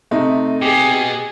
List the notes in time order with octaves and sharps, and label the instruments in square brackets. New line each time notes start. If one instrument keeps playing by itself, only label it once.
[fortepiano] C3 D#4 [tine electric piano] A3
[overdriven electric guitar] B2 [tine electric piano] G4 [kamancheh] G#4